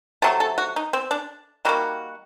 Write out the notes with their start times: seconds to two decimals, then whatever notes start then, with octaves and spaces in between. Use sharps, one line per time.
0.22 C3 F#3 A3 A4
0.40 A4
0.58 F#4
0.76 D#4
0.93 C4
1.11 D4
1.65 D#3 G3 A#3 F#4